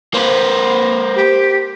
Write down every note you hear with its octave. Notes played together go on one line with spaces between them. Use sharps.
A#3 B4 C5
G4